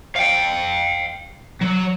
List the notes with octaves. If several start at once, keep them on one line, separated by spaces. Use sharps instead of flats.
F5 G5
F#3